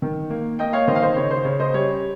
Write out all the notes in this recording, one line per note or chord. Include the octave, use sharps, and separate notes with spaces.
D#3
A#3
A#3 D#5 G5
C#5 F5
D#3 C5 D#5
F5
C5 D#5
C#3 C#5
C5
C#3 C#5
C5 D#5
G3 C#5